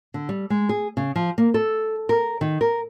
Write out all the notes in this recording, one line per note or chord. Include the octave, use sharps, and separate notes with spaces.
D3
G3
G#3
G#4
C#3
F3
A#3
A4
A#4
D#3
A#4